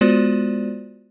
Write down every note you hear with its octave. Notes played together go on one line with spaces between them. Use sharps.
G#3 B3 F4 F#4 C5 D5